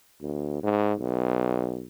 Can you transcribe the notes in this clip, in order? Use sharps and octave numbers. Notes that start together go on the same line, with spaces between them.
D2
G#2
B1